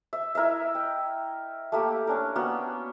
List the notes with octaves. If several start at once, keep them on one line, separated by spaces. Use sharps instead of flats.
E5
E4 A#4 D#5 E5
G5
A3 A#3 G4
C#4 D4 A#4
A#3 B3 F#4